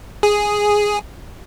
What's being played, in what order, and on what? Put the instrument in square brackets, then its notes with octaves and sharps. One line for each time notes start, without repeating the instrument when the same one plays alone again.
[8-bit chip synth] G#4